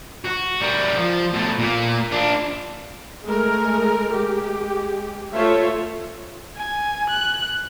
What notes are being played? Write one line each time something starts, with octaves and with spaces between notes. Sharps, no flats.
F#4
G3 A#4
F3
B2 A3
A#2 A#3
D4 F4
G#3 A3 A#4
G#3 G4
A3 F4 A4 C5 C#5 E5
G#5
F#6